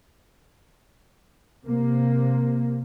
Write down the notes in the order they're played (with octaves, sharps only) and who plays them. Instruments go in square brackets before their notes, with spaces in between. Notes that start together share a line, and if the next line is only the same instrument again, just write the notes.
[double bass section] C3 A#3